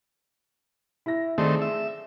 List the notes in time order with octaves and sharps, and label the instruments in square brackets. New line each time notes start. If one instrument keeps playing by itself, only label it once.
[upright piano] E4 A#6
[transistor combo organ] D#3 A3 C4 [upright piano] G#4 D5
[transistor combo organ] E5